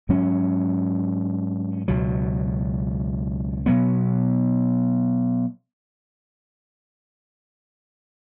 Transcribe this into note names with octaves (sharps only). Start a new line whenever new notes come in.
G#2 F#3 C#4
C#2 B2 F#3
B2 F#3 B3